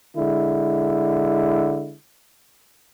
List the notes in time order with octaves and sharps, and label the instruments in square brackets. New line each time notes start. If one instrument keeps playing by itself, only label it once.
[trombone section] D3 G#3 E4